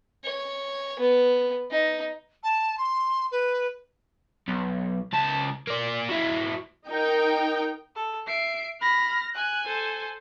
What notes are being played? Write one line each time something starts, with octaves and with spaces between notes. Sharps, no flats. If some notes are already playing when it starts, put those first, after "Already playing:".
C#5
B3
D#4
A5
C6
B4
B1
C#2 A5
A#3 D5
F#3 E4
D#4 A#4 G5
A4
E5 C7 D7
B5 F6 A#6
G#5 F#6
A4 C5